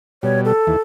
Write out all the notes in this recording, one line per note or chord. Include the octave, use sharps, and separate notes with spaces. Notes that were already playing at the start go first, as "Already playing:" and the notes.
B2 G3 C#5
A4
D#2 E3